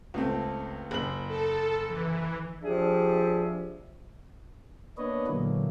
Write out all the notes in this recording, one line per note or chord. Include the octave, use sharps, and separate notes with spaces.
C#2 A3 C4
F#1 F#7
A4
E3
F3 D4 G4 G#4 E5
A#3 B3 D4 B4 C#5 D#5
A#2 D3 E3 F#3 A#3